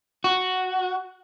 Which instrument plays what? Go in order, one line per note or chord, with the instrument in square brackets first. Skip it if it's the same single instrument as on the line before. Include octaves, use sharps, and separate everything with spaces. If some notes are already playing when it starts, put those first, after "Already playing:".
[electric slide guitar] F#4